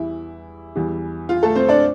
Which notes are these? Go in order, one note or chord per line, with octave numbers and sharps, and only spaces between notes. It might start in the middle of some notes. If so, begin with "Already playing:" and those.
Already playing: E2 E3 G3 E4
E2 E3 G3
F4
A3 A4
C4 C5
D4 D5